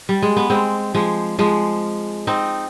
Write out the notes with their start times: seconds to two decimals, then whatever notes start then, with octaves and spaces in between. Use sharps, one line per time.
0.09 G3
0.22 G#3
0.37 B3
0.50 G#3 C4
0.95 F3 G#3
1.39 F3 G#3
2.27 C4 D#4